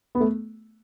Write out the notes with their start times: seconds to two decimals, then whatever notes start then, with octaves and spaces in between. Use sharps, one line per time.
0.15 B3
0.20 A3